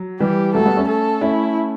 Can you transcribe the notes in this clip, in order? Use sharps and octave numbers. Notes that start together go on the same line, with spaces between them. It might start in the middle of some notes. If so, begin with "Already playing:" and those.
Already playing: F#3
E3 G3 G4
F#3 A3 A4
G3 B3
A3 C#4
A4
A3 C#4 E4